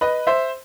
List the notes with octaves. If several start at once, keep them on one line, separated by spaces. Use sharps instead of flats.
B4 D#5
C5 E5